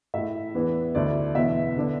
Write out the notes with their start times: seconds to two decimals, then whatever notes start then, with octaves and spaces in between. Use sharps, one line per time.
0.14 A2 A3 E4 E5
0.54 E2 E3 B3 D4
0.95 D2 D3 A3 E4 D5
1.35 E2 B2 B3 E4 E5
1.77 D3 B3 D4